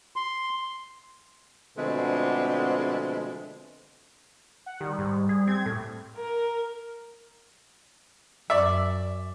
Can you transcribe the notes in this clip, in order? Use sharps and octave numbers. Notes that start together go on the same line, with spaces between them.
C6
B2 D3 F3 G#3 A3 C4
F#5
D#3 G3
G#2
G#4
C4 G#6
A2 A3
A#4
F#2 D5 E5